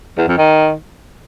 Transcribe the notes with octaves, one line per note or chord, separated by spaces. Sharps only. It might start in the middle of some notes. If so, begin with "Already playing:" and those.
E2
F2
D#3